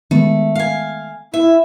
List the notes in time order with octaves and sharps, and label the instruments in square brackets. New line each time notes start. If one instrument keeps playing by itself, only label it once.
[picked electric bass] D#3 G#3 B3 [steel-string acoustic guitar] A3
[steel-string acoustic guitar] F5 G#5
[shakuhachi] E4 [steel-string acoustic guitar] E5